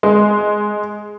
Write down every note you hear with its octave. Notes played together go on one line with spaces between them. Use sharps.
G#3